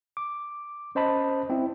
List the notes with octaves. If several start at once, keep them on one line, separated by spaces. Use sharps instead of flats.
D6
C#4 C5 D#5 A5 B5
C4 E4